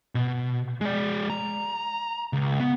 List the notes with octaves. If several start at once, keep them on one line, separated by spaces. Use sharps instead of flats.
B2
G#3 D5
A#5
C#2
B3